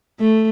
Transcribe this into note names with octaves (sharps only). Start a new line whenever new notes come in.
A3